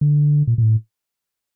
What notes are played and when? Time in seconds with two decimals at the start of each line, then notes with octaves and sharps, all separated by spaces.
0.01 D3
0.47 A#2
0.58 A#2
0.62 A2